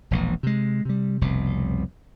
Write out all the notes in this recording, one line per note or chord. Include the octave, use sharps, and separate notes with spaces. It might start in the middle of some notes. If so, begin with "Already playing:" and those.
E1 A#1 E3
C3 G#3
C3 G3
F1 C2 B2